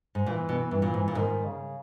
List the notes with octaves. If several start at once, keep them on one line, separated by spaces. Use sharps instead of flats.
G#2
A#2 E3
B2
G2 E3
A#2
G#2
A#2
G#2 D#3
C#3